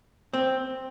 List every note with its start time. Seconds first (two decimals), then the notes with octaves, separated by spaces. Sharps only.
0.33 C4